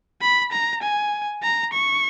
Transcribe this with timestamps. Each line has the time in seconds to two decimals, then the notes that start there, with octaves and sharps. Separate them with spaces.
0.21 B5
0.52 A#5
0.82 G#5
1.43 A#5
1.73 C#6